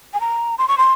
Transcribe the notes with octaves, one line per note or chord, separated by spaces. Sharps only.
G#5
A#5
C6
C#6
C6